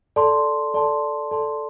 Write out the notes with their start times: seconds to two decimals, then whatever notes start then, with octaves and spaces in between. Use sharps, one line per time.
0.16 A4 D5 A5 C6
0.74 A4 D5 A5 C6
1.31 A4 D5 A5 C6